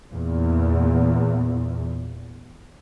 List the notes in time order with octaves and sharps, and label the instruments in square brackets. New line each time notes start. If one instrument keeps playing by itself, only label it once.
[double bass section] E2 A#2